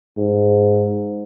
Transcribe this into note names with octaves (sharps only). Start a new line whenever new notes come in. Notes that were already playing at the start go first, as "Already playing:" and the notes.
G#2